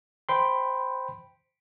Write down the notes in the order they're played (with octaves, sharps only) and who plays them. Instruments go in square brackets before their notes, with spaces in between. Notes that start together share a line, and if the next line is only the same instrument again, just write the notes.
[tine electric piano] C5 G5 B5 C6